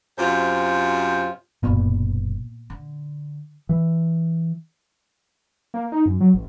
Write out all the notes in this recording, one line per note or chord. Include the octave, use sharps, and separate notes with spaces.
F#2 C3 F4 C5
F#1 B1 A#2 A#3 B3
D3
E3
A#3
D#4
F#2
F#3
A1